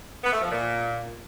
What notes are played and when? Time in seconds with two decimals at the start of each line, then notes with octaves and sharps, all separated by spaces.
0.24 B3
0.33 A3
0.41 F3
0.50 A#2